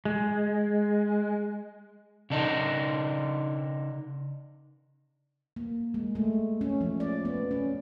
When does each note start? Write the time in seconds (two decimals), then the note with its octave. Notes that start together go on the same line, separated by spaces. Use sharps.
0.05 G#3
2.30 C#3 D4 D#4
5.56 A#3
5.94 G#3
6.15 A3
6.61 C#4
6.81 F3
7.00 D5
7.25 B3
7.51 C#4